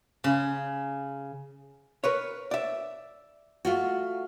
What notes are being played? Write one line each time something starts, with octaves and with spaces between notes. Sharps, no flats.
C#3
A#4 B4 C#5
D5 E5
A3 F4 F#4